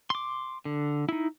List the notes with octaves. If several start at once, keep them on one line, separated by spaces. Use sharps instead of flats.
C6 D6
D3
D#4 E4